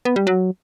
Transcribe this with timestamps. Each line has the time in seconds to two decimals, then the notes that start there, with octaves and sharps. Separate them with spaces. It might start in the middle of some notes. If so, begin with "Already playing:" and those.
0.05 B3
0.16 G3
0.27 F#3